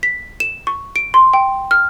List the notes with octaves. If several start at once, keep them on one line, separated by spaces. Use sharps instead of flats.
B6
E7
C#6
D7
C6
G5
F6